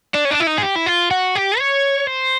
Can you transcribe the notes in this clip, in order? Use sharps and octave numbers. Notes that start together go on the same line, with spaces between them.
D4
C#4
D4
E4
D#4
G#4
G4
E4
F4
F#4
G4
C#5
C5